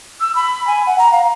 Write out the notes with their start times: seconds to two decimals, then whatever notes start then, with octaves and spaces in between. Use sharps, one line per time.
0.20 E6
0.36 B5
0.67 G#5
0.86 F#5
0.99 A#5
1.12 F5